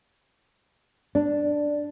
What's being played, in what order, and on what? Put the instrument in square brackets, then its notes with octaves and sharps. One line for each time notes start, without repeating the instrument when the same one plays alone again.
[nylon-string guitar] D4